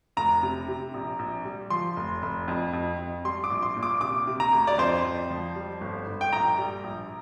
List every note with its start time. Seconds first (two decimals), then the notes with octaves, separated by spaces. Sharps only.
0.17 F1 A#5
0.43 C3
0.68 C3
0.94 A#1
1.19 A#1
1.45 G3
1.70 F3 C6
1.96 F1
2.22 F1
2.48 F2
2.73 F2
2.99 F2
3.24 G3 C6
3.44 D6
3.50 A#1
3.62 C6
3.76 A#2
3.83 D6
4.01 C3 D6
4.27 C3
4.40 A#5
4.52 D2
4.67 D5
4.78 F2 C5
5.05 F2
5.30 F3
5.56 G3
5.81 G1
6.07 G1
6.21 G5
6.32 A#1 A#5
6.58 G3
6.84 A#1